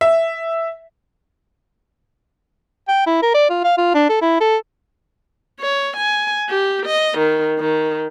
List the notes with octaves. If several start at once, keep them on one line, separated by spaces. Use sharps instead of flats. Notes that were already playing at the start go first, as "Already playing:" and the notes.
E5
G5
E4
A#4
D5
F4
F5
F4
D4
A4
E4
A4
C#5
G#5
G4
D#5
D#3
D#3